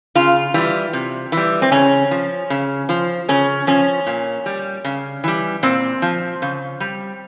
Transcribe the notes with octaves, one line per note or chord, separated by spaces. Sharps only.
C#3 F4
E3 G3
C3
E3
G3
C4
C#3 C#4
F3
C#3
F3
C#3 C#4
F3 C#4
A#2
G3
C#3
E3 G3
A#2 C4
F3
C#3
G3